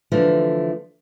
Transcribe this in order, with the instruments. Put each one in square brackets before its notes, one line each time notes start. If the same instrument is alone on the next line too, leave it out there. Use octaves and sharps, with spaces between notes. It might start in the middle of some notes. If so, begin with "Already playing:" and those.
[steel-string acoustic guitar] D3 E3 F3 A3